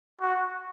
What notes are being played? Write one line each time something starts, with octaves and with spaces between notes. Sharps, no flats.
F#4